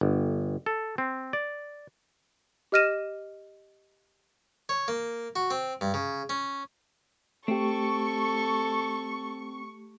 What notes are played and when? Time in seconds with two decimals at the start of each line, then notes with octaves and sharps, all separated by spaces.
0.01 G1
0.66 A4
0.98 C4
1.33 D5
2.72 G4 D#5 F6 A#6 D#7 E7
4.69 C#5
4.88 A#3
5.36 F#4
5.51 C4
5.81 G2
5.94 C#3
6.29 C#4
7.48 A3 C4 G4 A4 C#6